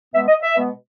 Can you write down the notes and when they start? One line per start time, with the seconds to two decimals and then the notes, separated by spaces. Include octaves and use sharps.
0.13 B2 G#3 B3 E5
0.28 D#5
0.41 E5
0.55 B2 G#3 B3